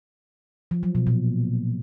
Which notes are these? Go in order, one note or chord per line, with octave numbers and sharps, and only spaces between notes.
F3
F#3
B2
A#2